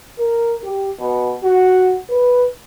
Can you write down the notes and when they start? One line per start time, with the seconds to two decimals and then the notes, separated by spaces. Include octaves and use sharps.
0.19 A#4
0.63 G4
1.00 B2
1.43 F#4
2.09 B4